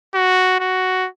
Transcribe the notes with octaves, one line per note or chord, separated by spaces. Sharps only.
F#4
F#4